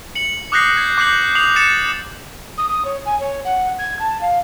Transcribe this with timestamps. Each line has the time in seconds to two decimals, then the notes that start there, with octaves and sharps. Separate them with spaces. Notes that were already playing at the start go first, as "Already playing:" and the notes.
0.15 C#7 F#7
0.52 D6 D#6 F#6 G6 A#6 C7
0.77 G#6 C7
0.98 D6 G6 C7 F#7
1.35 D#6 C7 F7 F#7
1.56 G6 A6 C#7 E7
2.57 D#6
2.68 D#6
2.84 C#5
3.05 G#5
3.20 C#5
3.44 F#5
3.78 G#6
3.99 A5
4.21 F5